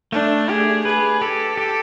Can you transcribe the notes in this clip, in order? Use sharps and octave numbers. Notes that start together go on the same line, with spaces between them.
A3 D4
G4 G#4
G#4 B4
G4 A4
G4